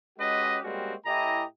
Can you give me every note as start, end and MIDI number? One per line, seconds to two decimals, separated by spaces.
0.18 0.58 56
0.18 0.58 61
0.18 0.58 66
0.18 0.58 67
0.18 0.58 71
0.18 0.58 75
0.63 0.94 55
0.63 0.94 56
0.63 0.94 58
0.63 0.94 60
0.63 0.94 61
0.63 0.94 66
1.06 1.44 45
1.06 1.44 64
1.06 1.44 67
1.06 1.44 75
1.06 1.44 80
1.06 1.44 82